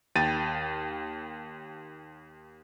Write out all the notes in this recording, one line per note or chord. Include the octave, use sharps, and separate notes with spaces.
D#2 G5 A6 D#7